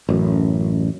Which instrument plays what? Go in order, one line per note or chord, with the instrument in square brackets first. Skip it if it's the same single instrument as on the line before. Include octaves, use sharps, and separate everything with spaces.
[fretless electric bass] A1 F#2